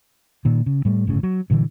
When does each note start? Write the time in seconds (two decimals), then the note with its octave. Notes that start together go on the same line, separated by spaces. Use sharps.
0.45 A#2 D#3
0.66 C#3
0.85 A2 G3 A3
1.07 G1 A2 C#3
1.23 F#3
1.50 G2 A#2 D3 E3